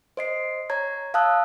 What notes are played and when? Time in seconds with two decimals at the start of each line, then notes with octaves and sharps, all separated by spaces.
0.17 C5 D#5 C7
0.70 C#5 A#5 G#6
1.14 F5 A5 D#6 E6 F#6